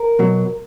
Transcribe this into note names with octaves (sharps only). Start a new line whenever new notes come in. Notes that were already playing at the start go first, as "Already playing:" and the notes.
Already playing: A#4
B2 F#3